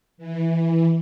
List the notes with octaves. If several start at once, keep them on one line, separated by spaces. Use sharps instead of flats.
E3